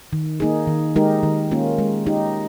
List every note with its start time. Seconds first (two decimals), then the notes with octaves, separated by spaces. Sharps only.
0.13 D#3
0.40 A#3 D#4 G#4
0.67 D#3
0.96 G#3 D#4 G4 A#4
1.23 D#3
1.51 A#3 C#4 F4
1.79 G#3
2.07 D#4 G4